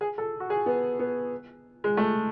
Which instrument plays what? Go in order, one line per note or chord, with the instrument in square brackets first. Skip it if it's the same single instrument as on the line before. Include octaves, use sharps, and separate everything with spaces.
[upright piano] G#4
A4
F#4
G#4
B3
B3
G#3
A3